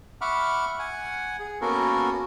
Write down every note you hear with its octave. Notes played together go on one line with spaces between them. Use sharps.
E5 F#5 B5 C#6 D6 F6
F#5 G#5
G#4
A#3 B3 C#4 F#4 A4 A#4